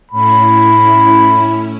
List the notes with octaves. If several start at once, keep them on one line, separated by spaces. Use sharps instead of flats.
A2 C#4 E4 B5